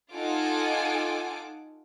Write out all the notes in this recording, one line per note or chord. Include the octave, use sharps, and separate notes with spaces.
D#4 F4 A4 F#5 G#5 D6